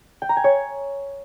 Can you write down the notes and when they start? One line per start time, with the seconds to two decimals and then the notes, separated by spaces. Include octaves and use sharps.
0.22 G5
0.29 A#5
0.37 G#5
0.44 C#5